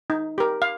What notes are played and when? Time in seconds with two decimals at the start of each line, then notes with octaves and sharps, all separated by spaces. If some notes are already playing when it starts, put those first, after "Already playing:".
0.10 D#4
0.38 G4 A#4
0.62 F5